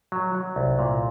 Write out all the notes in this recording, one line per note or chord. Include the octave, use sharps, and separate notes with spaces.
F#3
F#3
C2
A#2